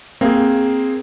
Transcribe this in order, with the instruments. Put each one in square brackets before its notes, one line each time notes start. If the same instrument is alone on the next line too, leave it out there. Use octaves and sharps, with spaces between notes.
[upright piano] A#3 [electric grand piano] C4 G#4